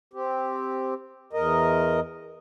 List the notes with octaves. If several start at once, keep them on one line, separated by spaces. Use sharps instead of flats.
C4 G4
E2 A#4 D#5